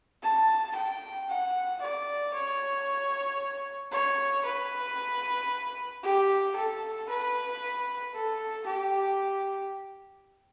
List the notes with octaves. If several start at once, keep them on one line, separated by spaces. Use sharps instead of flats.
A5
G5
F#5
D5
C#5
C#5
B4
G4
A4
B4
A4
G4